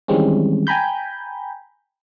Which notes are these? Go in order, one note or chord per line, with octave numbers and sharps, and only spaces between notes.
D#3 E3 G3 G#3 C4 C#4
G5 G#5 A#5 B5 G6